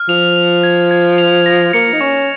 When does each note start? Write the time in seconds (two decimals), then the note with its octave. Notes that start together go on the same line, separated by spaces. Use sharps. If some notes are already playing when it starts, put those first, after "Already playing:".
Already playing: F6
0.09 F3 F7
0.36 F7
0.63 G#6
0.91 G#6
1.18 F7
1.46 A#6
1.73 A#3 C#7
1.93 D#4
2.01 C#4 C#6